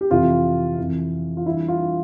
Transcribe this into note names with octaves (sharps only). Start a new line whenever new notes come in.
G4
F2 C3 E3 F4
F2 E3
F4
G2 E3 E4
F4